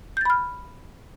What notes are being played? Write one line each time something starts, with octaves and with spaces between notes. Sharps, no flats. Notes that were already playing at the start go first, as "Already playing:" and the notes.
B5 F6 G6 A6